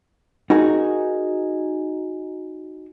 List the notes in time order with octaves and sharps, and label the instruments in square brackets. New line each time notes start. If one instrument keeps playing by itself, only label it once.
[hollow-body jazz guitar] D#4 F#4 G#4 A#4